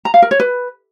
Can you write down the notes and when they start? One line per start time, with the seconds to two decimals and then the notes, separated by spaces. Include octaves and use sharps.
0.05 A#5
0.14 F5
0.22 A#4
0.31 C#5
0.40 B4